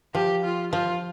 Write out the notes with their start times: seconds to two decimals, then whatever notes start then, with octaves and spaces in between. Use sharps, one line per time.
0.15 F3 G4
0.44 F4
0.72 F3 F4